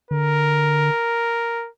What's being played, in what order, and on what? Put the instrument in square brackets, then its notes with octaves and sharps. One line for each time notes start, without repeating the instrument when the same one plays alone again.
[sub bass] D3 [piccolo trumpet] A#4